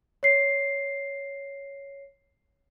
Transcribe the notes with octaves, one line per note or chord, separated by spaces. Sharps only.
C#5 C7